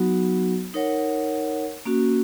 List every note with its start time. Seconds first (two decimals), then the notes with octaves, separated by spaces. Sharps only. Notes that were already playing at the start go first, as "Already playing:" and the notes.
Already playing: F#3 B3 D#4 F#4
0.74 D#4 A#4 C#5 F#5
1.85 A#3 C#4 F#4